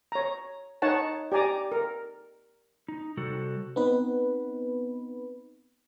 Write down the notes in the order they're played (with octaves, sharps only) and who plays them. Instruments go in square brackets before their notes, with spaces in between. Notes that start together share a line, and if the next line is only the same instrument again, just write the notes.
[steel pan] C#5 A#5
D#4 C#5 F#5 A5
G4 D5 G#5 A#5 D6
A#4
[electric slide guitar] D#4
C3 G3 F#4 A4
[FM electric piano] B3 C4 D#4 B4